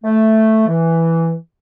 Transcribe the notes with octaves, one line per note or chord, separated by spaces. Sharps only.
A3
E3